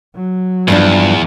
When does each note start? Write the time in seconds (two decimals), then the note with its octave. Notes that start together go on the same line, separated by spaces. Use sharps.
0.15 F#3
0.68 E2 G2 F3 D4